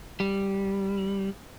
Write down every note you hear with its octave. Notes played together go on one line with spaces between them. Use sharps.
G3